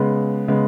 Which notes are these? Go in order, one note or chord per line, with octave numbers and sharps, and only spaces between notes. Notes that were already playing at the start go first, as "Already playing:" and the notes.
Already playing: C#3 G#3 B3
C#3 G#3 B3